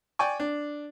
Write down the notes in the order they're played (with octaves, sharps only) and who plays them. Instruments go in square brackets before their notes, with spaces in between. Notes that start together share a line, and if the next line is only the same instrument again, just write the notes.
[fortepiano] D5 G5 G#5 C#6
D4